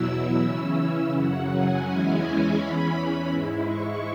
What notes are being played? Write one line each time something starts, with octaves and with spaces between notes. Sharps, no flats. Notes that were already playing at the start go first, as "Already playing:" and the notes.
Already playing: E2 B2 F#3 E4 E6
C#3 E3 C#4 E4
F#2 C#3 F#3 F#5
G#5
E2 E3 G#3 C#4 E4
E2 E3 C#4 B5
G#2 G#3 E4
C#6